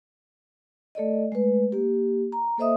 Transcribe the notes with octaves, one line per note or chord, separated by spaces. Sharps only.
A3 A4 D5 D#5
G#3 A3 B4
A#3 G4
A#5
A#3 A4 C5 D#5 E5 D#6